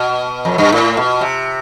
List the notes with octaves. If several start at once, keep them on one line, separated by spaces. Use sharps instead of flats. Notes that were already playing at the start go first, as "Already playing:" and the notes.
Already playing: B2
F2
G2
A2
B2
C3